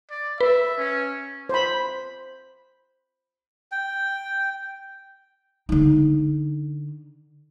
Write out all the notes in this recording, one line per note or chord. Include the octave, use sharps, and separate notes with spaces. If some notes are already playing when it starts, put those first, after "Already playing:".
D5
B4 E5
C#4
C5 B5
G5
D3 D#4